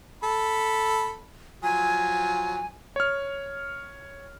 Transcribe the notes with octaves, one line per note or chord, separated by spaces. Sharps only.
A4 B5
F3 F#3 G#5
C#5 F6